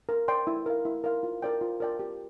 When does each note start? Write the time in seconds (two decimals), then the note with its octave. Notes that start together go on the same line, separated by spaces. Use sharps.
0.09 A#4
0.28 D5 G5 C6
0.47 E4
0.66 A#4 F5
0.85 E4
1.04 A#4 F5
1.23 F4
1.42 A#4 D5 G5
1.61 F4
1.80 A#4 D5 G5
1.99 G4